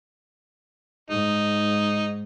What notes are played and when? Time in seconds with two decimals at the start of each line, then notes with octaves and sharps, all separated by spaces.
1.10 G#2 D#4